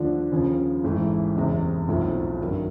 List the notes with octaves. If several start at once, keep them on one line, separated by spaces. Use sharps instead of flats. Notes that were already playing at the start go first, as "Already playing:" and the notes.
Already playing: D#2 D3 F3 A3 D4
D#2 C#3 F3
A1 G#2 E3 A3
F#1 E2 C3
B1 A2 F3 A3 C4
G2 D#3 F#3